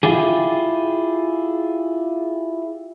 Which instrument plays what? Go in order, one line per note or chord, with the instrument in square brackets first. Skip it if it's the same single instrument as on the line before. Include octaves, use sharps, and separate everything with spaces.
[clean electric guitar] E4 F4 G4 G#4